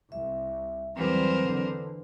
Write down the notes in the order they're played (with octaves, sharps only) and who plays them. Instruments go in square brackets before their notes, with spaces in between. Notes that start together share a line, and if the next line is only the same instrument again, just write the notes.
[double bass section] C2 [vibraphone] E5
[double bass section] E2 G3 [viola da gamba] E3 A#4 C5 [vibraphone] F#3 C4
[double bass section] D3